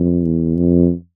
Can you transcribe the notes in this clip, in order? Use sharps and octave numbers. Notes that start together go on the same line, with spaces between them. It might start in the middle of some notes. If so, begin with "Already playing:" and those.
Already playing: F2
E2
F2